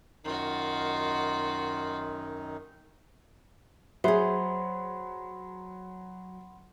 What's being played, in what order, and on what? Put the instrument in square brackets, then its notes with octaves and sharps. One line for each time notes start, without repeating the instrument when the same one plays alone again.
[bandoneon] F#2 D#3 D#4 [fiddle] F4 F#4
[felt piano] F#3 [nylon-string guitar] G#4 C5 [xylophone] E5 [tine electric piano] F#5 B5 C6